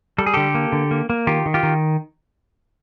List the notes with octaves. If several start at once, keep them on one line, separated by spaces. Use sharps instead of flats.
G3 A4
G#4
D3 G4 A4
A#3
D3
A#3
A#3
D#3 F4 G4
D#3
F4 G4
D#3